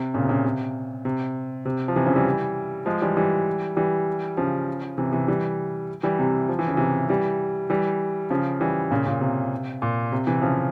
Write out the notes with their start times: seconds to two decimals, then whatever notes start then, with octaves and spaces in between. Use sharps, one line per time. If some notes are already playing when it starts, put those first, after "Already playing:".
Already playing: C3
0.14 A#2 C#3
0.24 C3
0.29 A#2 C#3
0.45 C3
1.05 C3
1.65 C3
1.88 F3
1.96 C3 E3
2.06 C#3 F3
2.16 E3 G3
2.86 F3 G#3
3.02 E3 G3
3.17 E3 G3
3.76 E3 G3
4.37 C#3 F3
4.98 C3 E3
5.13 C3 E3
5.28 E3 G3
6.03 E3 G3
6.19 C3
6.49 F3
6.59 E3
6.68 C#3
6.77 C3 E3
7.09 E3 G3
7.70 E3 G3
8.30 C#3 F3
8.61 E3 G3
8.91 A#2 C#3
9.06 A#2 C#3
9.21 C3
9.82 A#2
10.12 C3
10.27 C3 E3
10.42 C#3 F3